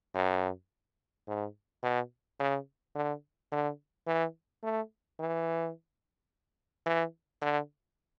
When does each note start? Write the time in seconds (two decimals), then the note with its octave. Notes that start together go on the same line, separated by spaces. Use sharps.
0.15 F#2
1.28 G#2
1.83 B2
2.40 C#3
2.95 D3
3.51 D3
4.07 E3
4.63 A3
5.19 E3
6.86 E3
7.42 D3